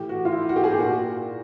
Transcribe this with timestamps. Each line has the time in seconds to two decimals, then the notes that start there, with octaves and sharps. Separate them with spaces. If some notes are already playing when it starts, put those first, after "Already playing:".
Already playing: A2 E3 G4
0.09 F#4
0.25 F4
0.33 E4
0.49 F#4
0.56 G4
0.64 G#4
0.71 G4
0.79 A#2 F#4